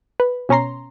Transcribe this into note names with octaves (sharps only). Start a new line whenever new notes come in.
B4
B2 C#4 C#5 A#5 C6